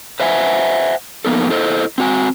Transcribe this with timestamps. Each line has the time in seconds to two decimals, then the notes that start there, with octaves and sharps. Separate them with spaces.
0.20 B4 C5 E5 F#5 G#5
1.25 F2 A#3 B3 D#4 A4
1.50 E4 A4 C5 D#5
1.98 C4 F#4 G#5